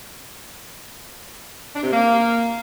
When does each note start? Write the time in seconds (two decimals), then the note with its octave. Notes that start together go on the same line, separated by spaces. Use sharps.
1.75 D4
1.83 C3
1.91 A#3